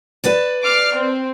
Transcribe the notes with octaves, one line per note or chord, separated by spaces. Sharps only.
B4 D5 A5
D6 F6 C7
C4